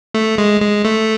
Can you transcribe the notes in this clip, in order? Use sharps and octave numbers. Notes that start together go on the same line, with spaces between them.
A3
G#3
G#3
A3